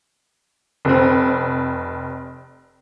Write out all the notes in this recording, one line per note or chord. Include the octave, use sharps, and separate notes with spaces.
F1 C4